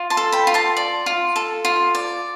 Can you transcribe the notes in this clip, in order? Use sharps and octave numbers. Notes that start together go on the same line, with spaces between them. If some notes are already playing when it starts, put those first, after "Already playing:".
Already playing: F4
A5 C6
A4
G5 B5
F4
A5 C6
D5
F4
A4
F4
D5